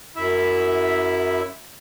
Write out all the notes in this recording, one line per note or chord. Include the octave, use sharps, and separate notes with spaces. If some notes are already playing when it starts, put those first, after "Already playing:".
F#2 E4 E5